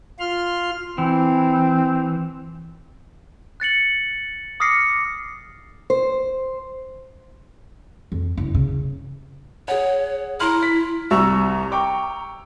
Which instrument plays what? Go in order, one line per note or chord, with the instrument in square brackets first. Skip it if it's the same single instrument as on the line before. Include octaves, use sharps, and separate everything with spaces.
[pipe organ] F4 C6 F6
[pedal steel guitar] E3 [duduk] C4
[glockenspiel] F#6 A6 C#7 F#7
D6 D#6 F6 A#6 C7 C#7
[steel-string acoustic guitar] C5
[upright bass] F2
F#1
C#3
[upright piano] G#4 F#5 [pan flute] C#5
[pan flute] E4 [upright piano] A#5 C6 F6
[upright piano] B6
[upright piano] C2 C#6 E6 [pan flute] A#5
[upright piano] G5 C#6 D6